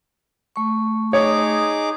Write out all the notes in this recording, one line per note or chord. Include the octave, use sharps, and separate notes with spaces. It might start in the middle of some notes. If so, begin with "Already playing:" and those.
A3 C#6
D#4 G#4 C#5 D6